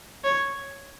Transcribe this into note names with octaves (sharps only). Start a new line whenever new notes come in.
C#5